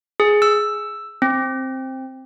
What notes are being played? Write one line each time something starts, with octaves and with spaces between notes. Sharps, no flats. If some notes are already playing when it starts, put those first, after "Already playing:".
G#4
E6
C4